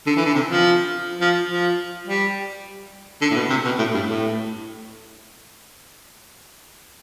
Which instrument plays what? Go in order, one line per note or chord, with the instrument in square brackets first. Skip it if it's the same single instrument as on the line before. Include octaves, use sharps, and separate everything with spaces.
[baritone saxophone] D3
E3
D3
C3
F3
F3
F3
G3
D3
A2
B2
C3
B2
A2
G2
A2